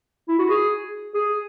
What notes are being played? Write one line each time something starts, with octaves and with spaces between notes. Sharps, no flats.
E4
F#4
G#4
G#4